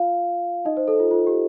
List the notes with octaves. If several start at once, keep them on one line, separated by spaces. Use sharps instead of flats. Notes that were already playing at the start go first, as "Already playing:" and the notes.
Already playing: F4 F5
D#4 D#5
C5
A4
F4
F4
G4